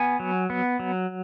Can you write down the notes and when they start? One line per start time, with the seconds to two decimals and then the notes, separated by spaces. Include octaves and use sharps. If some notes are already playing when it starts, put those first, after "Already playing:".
Already playing: B3 G#5
0.20 F#3
0.50 B3
0.80 F#3